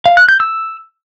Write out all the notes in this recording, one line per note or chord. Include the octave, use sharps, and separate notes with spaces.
F5
F#6
G6
E6